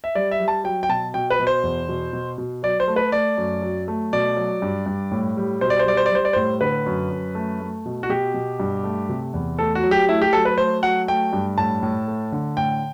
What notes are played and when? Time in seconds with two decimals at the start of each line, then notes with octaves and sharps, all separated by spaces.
0.04 E5
0.15 G3 D5
0.31 E5
0.40 G3
0.48 A5
0.64 F#3 G5
0.83 G5
0.89 B2 A5
1.14 B2 G5
1.30 B4
1.39 B2
1.47 C5
1.63 E2
1.89 B2
2.13 B2
2.38 B2
2.63 F#3 D5
2.80 C5
2.88 A3
2.96 B4
3.12 A3 D5
3.37 F#2
3.62 F#3
3.88 A3
4.13 B2 D5
4.37 F#3
4.62 G2
4.86 G2
5.11 A2
5.37 G3
5.61 B2 C5
5.70 D5
5.79 C5
5.86 G3 D5
5.97 C5
6.06 D5
6.11 G3 C5
6.25 D5
6.33 A2 C5
6.61 D3 B4
6.86 F#2
7.11 F#2
7.35 A3
7.60 A3
7.86 B2
8.03 F#4
8.09 B2 G4
8.34 B2
8.60 G2
8.84 A3
9.09 C3
9.34 E2
9.59 A3 A4
9.75 F#4
9.84 F#3
9.91 G4
10.09 A3 E4
10.21 G4
10.33 F#3 A4
10.45 B4
10.58 A3 C5
10.83 F#3 F#5
11.08 A3 G5
11.33 G2
11.58 A2 A5
11.83 A2
12.08 A3
12.32 D3
12.57 A2 G5